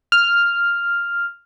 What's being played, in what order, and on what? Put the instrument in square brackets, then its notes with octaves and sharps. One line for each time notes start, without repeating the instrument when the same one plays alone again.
[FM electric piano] F6